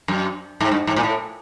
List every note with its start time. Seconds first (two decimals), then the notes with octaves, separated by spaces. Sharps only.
0.08 F#2
0.61 G#2
0.72 G2
0.87 G#2
0.96 A#2
1.03 A2